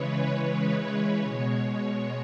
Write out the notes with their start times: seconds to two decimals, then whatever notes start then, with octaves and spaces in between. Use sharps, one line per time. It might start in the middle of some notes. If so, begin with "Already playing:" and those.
Already playing: C#3 E3 G#3 B4 C#5
0.31 C#5
1.20 B2 G#3